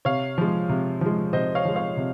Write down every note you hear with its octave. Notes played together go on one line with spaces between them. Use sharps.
C3 C#5 F5
F3 G#3
C3
F3 G#3
C3 C5 D#5
C#5 F5
F3 G#3
C#5 F5
C3